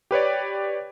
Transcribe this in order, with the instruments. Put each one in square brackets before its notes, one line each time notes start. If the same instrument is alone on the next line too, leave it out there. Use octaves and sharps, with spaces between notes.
[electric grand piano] G4 B4 C#5 D5